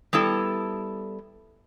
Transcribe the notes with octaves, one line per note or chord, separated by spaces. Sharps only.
G3 B3 E4 A4